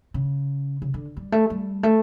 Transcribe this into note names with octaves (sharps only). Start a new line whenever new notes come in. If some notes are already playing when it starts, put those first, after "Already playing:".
C#3
C#3
D3
G3
A3
G3
A3